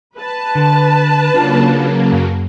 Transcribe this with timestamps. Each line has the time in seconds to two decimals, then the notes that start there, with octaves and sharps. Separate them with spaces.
0.16 B4 A5
0.55 D3
1.34 C#3 F#3 A#3 D4 F4
2.12 F#2